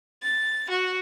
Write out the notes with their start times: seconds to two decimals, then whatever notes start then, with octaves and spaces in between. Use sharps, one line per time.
0.22 A6
0.70 F#4